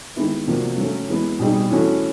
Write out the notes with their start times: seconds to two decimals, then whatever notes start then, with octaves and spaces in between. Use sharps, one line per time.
0.16 D#3 G#3 B3 E4
0.47 C3 F3 A#3 D4 F#4
0.78 F#3 A3 C#4
1.08 E3 G#3 B3
1.39 B2 G3 C4 D#4 G#4
1.71 E3 A3 C#4 F#4 A4